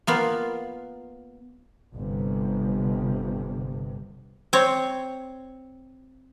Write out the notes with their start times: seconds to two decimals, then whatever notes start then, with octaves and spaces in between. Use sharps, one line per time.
0.07 A#3 B3 F4
1.94 G1 C3
4.53 C4 C#5